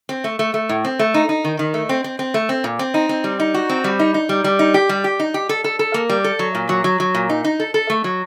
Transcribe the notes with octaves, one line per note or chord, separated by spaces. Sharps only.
C4
A3
A3
A3
A2
C4
A3
D#4
D#4
D#3
D#3
A3
C4
C4
C4
A3
C4
A#2
C4
D#4
C4
G3
D#4
F#4
C4
G3
D#4
D#4
G3
G3
D#4
G4
G3
G4
D#4
G4
A4
A4
A4
A#3
G3
A4
F#3
A#2
F#3
F#3
F#3
A#2
D#4
D#4
A4
A4
A3
F#3